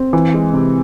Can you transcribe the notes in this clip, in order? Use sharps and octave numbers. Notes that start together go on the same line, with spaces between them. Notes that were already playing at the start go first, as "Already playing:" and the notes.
Already playing: C4
E3
G#3
C3